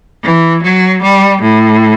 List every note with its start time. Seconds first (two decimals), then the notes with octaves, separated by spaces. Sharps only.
0.24 E3
0.63 F#3
1.02 G3
1.42 A2